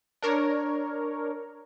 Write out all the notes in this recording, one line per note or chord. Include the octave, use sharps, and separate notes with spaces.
D4 A#4 C#5